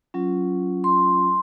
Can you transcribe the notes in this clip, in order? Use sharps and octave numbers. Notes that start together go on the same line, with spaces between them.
F#3 C#4 F4
C6